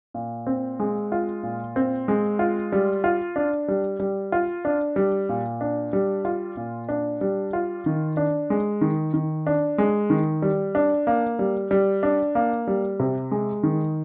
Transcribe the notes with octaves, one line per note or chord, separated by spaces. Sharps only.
A#2
C4
G#3
F4
A#2
C4
G#3
F4
G3
F4
D4
G3
G3
F4
D4
G3
A#2
D4
G3
F4
A#2
D4
G3
F4
D#3
D4
G#3
D#3
D#3
D4
G#3
D#3
G3
D4
A#3
G3
G3
D4
A#3
G3
C3
G#3
D#3